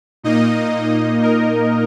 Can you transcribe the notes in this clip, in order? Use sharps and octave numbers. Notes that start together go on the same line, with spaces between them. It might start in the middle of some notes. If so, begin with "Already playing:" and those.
A#2 A#3 D#4 D#5
A#4